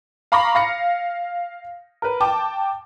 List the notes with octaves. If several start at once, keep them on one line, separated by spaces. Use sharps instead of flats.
F5 A#5 B5 C#6 D6 A#6
F5 A#6 C#7
A#4 B4
G5 A5 D6